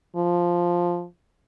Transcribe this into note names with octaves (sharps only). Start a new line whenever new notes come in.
F3